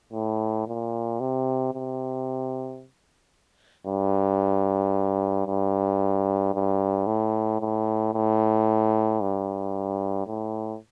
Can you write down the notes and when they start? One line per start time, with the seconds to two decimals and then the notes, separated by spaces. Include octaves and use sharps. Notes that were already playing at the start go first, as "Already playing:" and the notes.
0.13 A2
0.67 A#2
1.20 C3
1.74 C3
3.87 G2
5.47 G2
6.54 G2
7.07 A2
7.60 A2
8.14 A2
9.21 G2
10.27 A2